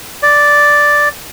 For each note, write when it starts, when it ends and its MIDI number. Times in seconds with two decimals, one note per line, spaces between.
0.23 1.09 74